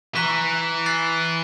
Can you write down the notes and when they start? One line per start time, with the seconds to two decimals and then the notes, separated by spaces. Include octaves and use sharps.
0.15 E3 A#5 C#6 F#6 B6
0.86 F#6 A6 C7